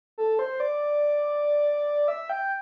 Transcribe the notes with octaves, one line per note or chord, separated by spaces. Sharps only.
A4
C5
D5
E5
G5